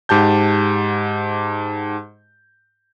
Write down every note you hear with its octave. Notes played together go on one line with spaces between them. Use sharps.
G#2 G4 A5 G6